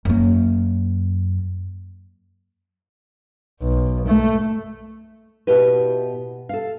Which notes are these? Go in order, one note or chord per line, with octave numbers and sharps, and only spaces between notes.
F#2 A#3
B1
A3
B2 E4 F#4 G4 B4
A4 F5